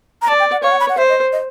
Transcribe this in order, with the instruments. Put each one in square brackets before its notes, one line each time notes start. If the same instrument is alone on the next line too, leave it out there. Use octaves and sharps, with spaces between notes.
[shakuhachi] A#5
[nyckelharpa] D5 [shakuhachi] A5
[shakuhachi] G5
F#5
[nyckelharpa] C#5 [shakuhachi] F5
[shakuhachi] F#5
B5
F#5
[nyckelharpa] C5 [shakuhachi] E5
[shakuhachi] D#5
D#5